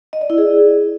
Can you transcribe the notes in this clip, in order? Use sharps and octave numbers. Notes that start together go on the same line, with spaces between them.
D#5
D5
E4
G#4